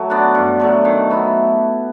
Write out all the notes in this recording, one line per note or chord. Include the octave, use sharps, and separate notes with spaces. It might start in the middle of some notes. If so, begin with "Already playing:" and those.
Already playing: F#3 A3
B3 D4 F#4
G2
D3 F#3 A3
D#3
F#3 B3 E4